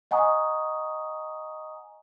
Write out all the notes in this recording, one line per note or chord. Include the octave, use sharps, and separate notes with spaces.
D#5 F#5 G#5 A#5 C#6 D#6